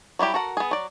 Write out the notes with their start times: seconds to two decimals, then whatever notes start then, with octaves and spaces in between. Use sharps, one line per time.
0.19 F#3 G3 E4 G4
0.34 F#4 A4 A#4 F#5
0.57 B3 G#4
0.71 F#3 D5